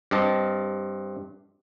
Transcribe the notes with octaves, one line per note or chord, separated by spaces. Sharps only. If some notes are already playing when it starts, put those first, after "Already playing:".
G2 C4 D#5 A5